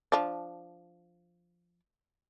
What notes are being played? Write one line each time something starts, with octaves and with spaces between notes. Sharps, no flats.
F3 D4